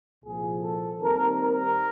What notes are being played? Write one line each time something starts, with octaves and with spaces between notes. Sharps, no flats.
C2 A#2 F3 G#4
A4
D#2 D#3 G3 C4 A#4
A#4